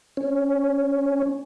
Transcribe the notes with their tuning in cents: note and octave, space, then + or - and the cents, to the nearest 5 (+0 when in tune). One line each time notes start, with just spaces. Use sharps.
C#4 +0